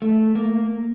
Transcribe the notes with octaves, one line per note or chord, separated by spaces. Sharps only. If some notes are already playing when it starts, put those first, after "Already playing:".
A3
A#3